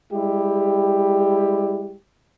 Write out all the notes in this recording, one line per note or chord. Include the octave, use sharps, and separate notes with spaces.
G3 G#3 E4 G4